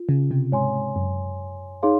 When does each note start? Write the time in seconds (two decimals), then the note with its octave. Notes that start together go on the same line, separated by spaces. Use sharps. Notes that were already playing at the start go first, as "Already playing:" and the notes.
Already playing: F4
0.09 C#3
0.31 C3
0.52 G#2 C#5 G#5 C6
0.74 G#2
0.96 F#2
1.83 D#4 G#4 C#5 F5 C6